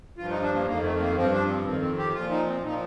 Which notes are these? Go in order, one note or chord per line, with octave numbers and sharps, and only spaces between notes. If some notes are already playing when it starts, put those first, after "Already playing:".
G2 F3 F4
D#4
D4
A#3
F2 D#3 A#3
A3
A#3
G2 F3 C4
D4
C4
F2 D#3 C4
C4
G4
A#2 F3 F4
D#4
C4
A#2 F3 D#4